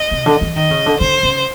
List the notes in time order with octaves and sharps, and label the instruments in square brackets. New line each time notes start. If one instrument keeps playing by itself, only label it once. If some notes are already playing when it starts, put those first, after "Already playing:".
Already playing: [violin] D#5
[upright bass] C3
D3
E3
[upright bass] D#3 [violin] D#5
[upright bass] C#3
D3
[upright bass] D3 [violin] C5
[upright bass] C#3